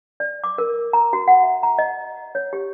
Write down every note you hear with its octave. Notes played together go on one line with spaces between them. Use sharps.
D5
D6
A#4
A#5
F#4
F#5
E5
A#5
D#5
C#5
G4